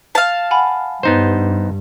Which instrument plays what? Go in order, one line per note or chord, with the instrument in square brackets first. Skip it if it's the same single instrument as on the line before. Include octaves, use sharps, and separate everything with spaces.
[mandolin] F5 A5
[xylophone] F#5 G#5 B5
[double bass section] G2 [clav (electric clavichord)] B3 D#4 C5